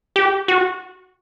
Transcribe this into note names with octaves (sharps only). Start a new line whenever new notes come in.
G4
F#4